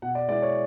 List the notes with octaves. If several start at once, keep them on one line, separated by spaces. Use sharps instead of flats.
B2 F#5
D5
G#3 B3 E4 D5
C#5